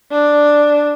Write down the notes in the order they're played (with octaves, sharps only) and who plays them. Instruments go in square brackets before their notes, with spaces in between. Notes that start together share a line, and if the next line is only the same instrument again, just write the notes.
[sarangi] D4